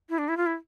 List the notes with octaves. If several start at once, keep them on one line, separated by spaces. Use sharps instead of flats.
E4
D4
E4
F4
E4